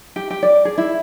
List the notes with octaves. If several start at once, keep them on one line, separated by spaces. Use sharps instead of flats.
G4
G4
D5
G#4
E4